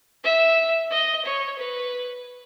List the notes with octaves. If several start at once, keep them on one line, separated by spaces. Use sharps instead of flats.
E5
D#5
C#5
B4